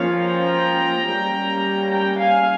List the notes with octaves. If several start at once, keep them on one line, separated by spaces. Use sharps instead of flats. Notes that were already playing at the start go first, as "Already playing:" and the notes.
Already playing: F3 A#3 C#4 C#5 F5
G5 A#5
G3 A#3 C#4
G5 A#5
F5 G#5